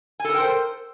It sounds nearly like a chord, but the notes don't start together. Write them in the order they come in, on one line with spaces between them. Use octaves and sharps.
G#5 A4 A#4 G5 C5